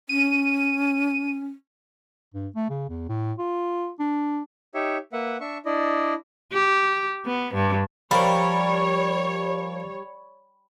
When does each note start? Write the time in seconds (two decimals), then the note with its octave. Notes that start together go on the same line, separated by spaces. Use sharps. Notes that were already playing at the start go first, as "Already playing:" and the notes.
0.09 C#4 D#7
2.34 G2
2.56 A3
2.70 C#3
2.89 E2
3.09 A2
3.39 F4
4.00 D4
4.74 D#4 G4 C#5 E5
5.13 A#3 B4 E5 F#5
5.41 D4 E5 C#6
5.65 D4 E4 D5 D#5
6.53 G4
7.25 B3
7.54 G2
8.11 F3 G3 A#4 C#5 B5